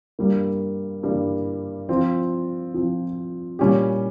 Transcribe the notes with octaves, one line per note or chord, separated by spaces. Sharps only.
G2 G3 A#3
G2 G3 A#3
F3 C4 F4
F3 C4 F4
A#2 G3 C#4 G4